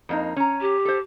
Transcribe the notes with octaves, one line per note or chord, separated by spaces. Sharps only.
F2 A#3 D#4
C#4 A#5
G4
A4 C5